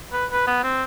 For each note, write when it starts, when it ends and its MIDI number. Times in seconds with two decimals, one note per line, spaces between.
0.13 0.26 71
0.31 0.43 71
0.47 0.61 59
0.63 0.84 60